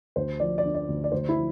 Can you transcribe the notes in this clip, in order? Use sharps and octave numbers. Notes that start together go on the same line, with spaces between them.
D2 C5
F3 D5
D5
D3
D5
D2
D5
D2 C5
E4
F3